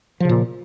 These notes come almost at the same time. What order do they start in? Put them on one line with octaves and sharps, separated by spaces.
F3 C#3 A#2